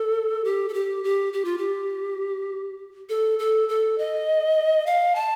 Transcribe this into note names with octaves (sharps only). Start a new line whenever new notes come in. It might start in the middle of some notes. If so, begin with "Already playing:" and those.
Already playing: A4
G4
A4
G4
G4
G4
F4
G4
A4
A4
A4
D#5
F5
A5